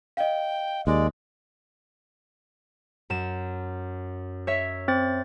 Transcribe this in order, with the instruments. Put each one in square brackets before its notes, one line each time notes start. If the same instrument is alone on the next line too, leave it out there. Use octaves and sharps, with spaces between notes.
[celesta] D#5 F5 [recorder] G5
[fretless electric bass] D#2 [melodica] G#3 [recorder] D5
[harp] F#2 E7
C#5 E5
[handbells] C4 C5 A6